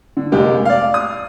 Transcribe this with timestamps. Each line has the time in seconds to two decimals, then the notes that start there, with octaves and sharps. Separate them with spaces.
0.17 D3
0.32 F1 G#3 A#3 G4
0.65 D5 F5
0.94 D#6